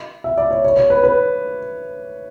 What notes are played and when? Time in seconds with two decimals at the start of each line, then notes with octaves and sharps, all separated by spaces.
0.24 E5
0.38 D5
0.51 C#5
0.65 C#5
0.77 C#5
0.90 B4
1.04 B4